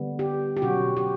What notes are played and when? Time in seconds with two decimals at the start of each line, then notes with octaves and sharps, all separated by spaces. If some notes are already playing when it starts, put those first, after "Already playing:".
Already playing: D3 G3 B3
0.19 G4
0.57 G4
0.62 B2 F#3 C#4 F#4
0.97 G4